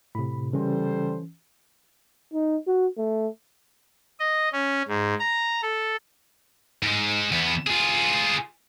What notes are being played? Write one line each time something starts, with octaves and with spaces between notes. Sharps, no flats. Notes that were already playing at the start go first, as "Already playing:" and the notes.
A2 C3 B5
C#3 E3 G3 C#4 A4 C5
D#4
F#4
A3
D#5
C#4
G#2
A#5
A4
G#2 G#3
E2 B3
F4 G#4